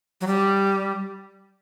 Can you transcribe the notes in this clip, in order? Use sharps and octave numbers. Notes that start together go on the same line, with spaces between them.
F#3
G3